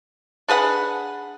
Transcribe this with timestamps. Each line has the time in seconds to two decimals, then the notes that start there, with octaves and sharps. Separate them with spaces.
0.48 D4 G#4 B4 F#5